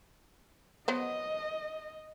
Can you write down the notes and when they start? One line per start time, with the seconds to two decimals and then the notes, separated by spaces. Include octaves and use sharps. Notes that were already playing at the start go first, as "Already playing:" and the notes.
0.88 F#3 B3 C5 D#5